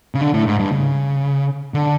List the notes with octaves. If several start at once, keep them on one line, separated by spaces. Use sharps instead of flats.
C#3
D3
A2
G#2
G2
C#3
D3